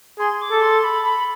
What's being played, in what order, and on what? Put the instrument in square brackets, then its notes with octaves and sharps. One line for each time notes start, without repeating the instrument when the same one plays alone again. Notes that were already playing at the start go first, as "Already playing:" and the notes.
[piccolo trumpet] G#4 [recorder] C6
[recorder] D6
[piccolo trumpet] A4
[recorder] C6
B5
B5